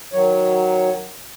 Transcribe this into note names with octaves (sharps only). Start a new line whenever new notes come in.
D#3 F#3 C#5